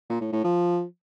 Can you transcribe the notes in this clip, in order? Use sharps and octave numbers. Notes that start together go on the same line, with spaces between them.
A#2
A2
A2
F3